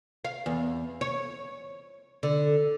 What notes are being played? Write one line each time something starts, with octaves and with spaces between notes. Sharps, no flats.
F5
E2
C#5
D3